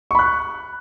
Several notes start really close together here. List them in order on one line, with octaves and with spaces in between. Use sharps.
C#6 B5 F#6